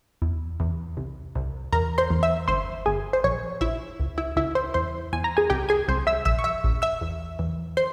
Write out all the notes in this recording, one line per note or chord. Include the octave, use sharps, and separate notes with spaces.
E2
E2
C2
C2
E2 A#4 A#5
C5 C6
E2
E5 E6
G1 C5 C6
G1 G#4 G#5
C5
A#1 C#5
A#1 E4 E5
C#2
E4 E5
C#2 E4 E5
C5 C6
E2 C5 C6
E2 G#5
A#5
G#4 G#5
C2 G4 G5
G#4 G#5
C2 C5 C6
E5 E6
A#1 E5 E6
C#6
E5 E6
A#1
E5 E6
E2
E2
C5 C6